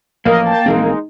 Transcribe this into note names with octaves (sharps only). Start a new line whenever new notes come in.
A1 F3 A#3 A#4 D#5
G5 A5 A6
A#1 E3 G#3 C4 D#4